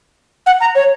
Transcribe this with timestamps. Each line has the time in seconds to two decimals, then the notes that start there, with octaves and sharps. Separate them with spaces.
0.46 F#5
0.61 A#5
0.75 C#5